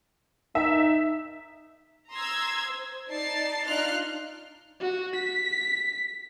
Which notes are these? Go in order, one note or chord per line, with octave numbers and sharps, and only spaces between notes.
D#4 E5
A#5 C6 D#6 E6 G#6
C5
D#4 D5 A5 A6 C7
D4 D#4 F4 C6 F6 F#6
F#4
B6